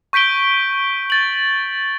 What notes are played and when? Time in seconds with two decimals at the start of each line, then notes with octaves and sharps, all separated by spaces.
0.13 C#6 G6 B6 D7 G7
1.10 A6 F#7